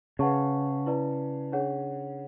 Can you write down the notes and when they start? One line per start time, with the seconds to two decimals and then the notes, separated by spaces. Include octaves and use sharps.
0.19 C#3 B4 F#5 A5 C#6
0.86 E4 B4 D5 A5
1.52 D4 G#4 C#5 F#5